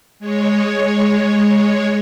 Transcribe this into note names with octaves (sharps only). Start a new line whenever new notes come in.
G#3 C#5